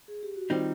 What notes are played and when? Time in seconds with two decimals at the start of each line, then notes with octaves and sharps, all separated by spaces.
0.08 G#4
0.23 G4
0.36 F#4
0.49 D#3 G3 C4 D#4 F4